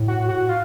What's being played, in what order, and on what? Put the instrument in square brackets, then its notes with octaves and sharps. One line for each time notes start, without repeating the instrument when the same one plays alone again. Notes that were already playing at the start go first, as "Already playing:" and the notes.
Already playing: [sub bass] A2
[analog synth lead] F#4
F#4
F4